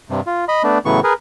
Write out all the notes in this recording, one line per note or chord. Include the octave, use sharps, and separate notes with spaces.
G2 C3
F4
D#5 B5
A3 B3 D4
A2 C#3 E3 F#3 B3 C#6
G#4 A#4 B4